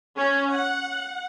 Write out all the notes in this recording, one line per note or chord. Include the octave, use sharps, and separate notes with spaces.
C#4
F#5